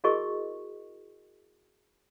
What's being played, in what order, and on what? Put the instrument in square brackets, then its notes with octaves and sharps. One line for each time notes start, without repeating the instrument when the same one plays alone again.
[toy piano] E4 F#4 G#4 A#4 D#5 C#6